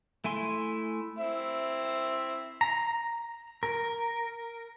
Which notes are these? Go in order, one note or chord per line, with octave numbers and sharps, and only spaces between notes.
A3 E4 G#5 C6
C4 E4
A#5
A#4